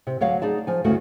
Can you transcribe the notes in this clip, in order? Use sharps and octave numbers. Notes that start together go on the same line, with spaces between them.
C3
D2 F#3 C#5 F5
D#4 G#4 D5 A5
F3 G#5
D2 G2 C#3 A3 E4 F#4